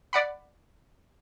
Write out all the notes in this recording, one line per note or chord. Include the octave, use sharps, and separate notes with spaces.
D5 F#5 B5